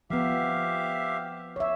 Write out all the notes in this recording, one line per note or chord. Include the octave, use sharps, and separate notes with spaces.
F3 B3 G4 E5 F5
C#5 E5